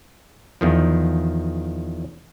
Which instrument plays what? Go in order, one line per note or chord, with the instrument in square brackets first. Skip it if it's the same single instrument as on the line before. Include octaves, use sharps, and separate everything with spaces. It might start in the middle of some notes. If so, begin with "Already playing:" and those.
[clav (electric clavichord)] E2 D#3 F3